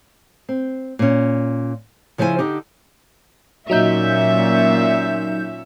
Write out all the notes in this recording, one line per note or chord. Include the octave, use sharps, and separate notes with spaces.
C4
A#2 C#4
C#3 F3 E4 C5 G#5
D3 D#4 G4
A#2 F#3 C#4 D#4 E5 G6